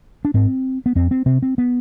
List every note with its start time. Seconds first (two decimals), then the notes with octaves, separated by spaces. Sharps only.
0.25 D4
0.34 G#2 C4
0.86 B3
0.95 F2 C4
1.11 C4
1.26 C3 C4
1.42 C4
1.58 B3